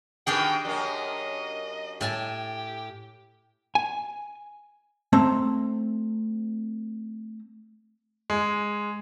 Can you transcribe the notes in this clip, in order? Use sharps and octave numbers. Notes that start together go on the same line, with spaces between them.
B2 D#3 D4 G4 G#4 G5
F#2 A#3 D#5
A2 G4 G#5 A5
G#5
A3 C4 A#5
G#3